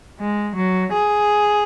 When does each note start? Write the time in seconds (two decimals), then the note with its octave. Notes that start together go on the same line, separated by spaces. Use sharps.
0.20 G#3
0.56 F#3
0.93 G#4